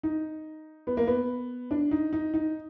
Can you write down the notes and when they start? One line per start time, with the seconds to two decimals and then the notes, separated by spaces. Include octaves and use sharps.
0.03 D#4
0.87 B3
0.97 A#3
1.07 B3
1.71 D4
1.91 D#4
2.13 D#4
2.34 D#4